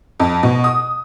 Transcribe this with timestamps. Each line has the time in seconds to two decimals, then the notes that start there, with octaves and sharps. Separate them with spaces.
0.20 F2
0.43 B2
0.64 D#6